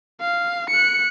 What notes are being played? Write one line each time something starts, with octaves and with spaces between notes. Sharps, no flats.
F5
F#6 C#7